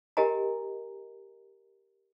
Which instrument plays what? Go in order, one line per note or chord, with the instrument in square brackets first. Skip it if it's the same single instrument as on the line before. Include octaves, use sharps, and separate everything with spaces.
[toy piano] G4 A#4 D#5 G#5 A#5